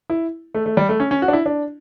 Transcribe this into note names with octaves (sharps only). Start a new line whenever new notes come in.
E4
A3
A3
G3
A3
C#4
C#4
F#4
D4
E4
D4